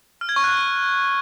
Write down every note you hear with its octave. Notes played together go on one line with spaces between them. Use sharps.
F6
G#6
C#6
F#6